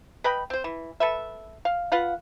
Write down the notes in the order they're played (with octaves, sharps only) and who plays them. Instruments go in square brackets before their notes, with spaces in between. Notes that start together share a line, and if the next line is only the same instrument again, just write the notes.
[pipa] B4 D#5 G5 B5
C4 C5
E3
A4 B4 E5
F5
F4 B4 F5 F#5